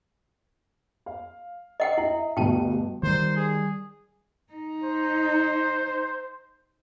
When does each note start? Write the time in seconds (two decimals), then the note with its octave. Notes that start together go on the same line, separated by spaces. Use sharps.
1.06 F5
1.80 D#5 F#5 G5
1.98 E4 D#5 E5
2.37 D2 G2 B2 G5 A5
3.03 D#3 G3 C5
3.36 G#4
4.52 D#4
4.84 C5